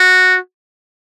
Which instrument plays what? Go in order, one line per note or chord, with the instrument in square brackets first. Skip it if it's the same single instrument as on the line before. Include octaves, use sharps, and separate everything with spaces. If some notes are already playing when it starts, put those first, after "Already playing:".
Already playing: [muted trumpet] F#4